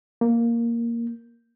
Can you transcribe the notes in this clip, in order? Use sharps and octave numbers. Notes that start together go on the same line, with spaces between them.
A#3